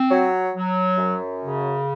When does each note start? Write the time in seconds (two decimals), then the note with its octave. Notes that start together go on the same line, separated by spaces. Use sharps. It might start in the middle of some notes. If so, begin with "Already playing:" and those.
Already playing: C4
0.09 F#3
0.54 F#3
0.98 F#2
1.43 C#3